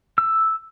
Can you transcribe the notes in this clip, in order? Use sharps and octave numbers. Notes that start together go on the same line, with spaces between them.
E6